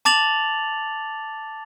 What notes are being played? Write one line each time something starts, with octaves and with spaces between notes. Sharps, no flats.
A5 D6 A6 F7 F#7